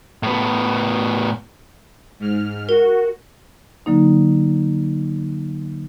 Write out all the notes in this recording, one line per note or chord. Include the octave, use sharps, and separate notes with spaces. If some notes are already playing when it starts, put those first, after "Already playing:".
A2 B3
G#2 F6
F#4 A#4
D3 F#3 A#3 D#4